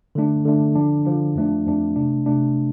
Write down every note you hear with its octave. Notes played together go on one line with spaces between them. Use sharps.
D3 A3 D4
D3 A3 D4
D3 F3 D4
D3 F3 D4
F2 F3 A3 D4
F2 F3 A3 D4
C3 A3 D4
C3 A3 D4